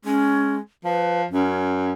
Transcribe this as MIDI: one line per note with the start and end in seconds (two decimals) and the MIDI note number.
0.05 0.60 56
0.05 0.55 61
0.84 1.25 53
0.84 1.22 71
1.31 1.93 42
1.31 1.89 61